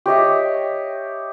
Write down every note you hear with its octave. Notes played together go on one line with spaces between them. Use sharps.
G4 C#5 D#5 E5